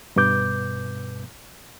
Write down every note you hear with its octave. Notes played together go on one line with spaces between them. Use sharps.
G2 B2 B4 D6 G6